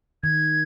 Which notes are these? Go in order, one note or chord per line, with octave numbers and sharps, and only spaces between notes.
D#3 G#6